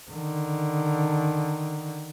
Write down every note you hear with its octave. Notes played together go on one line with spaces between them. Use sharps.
D3 D#3